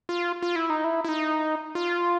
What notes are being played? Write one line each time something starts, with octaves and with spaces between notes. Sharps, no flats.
F4
F4
E4
D#4
E4
E4
D#4
F4